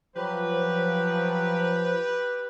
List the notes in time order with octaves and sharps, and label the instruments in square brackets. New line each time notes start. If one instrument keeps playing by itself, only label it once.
[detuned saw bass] F3 [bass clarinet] F#3 [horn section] G4 B4